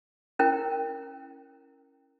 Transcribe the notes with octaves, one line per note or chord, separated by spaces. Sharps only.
C#4 E4 A#4 G5